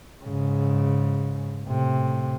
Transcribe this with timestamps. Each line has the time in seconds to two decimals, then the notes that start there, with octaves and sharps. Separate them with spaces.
0.25 G#2 C#3
1.64 A2 C3